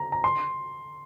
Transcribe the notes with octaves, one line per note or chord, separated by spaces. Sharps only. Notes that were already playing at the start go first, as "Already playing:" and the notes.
Already playing: A#5
A#5
C6